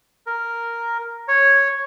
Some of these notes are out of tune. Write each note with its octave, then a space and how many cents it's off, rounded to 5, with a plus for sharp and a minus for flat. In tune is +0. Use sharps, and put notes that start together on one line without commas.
A#4 +0
C#5 -5